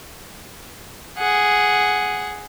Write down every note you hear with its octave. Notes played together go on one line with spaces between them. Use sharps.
G#4 F#5